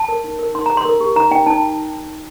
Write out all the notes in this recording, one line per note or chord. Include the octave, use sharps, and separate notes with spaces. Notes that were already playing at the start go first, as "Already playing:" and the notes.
Already playing: A5
A#4
D#4
A#4
D#4 C6
G4 A#5
C6
A#4
G4
D#4 A#5
D#4 G5
D#4 A5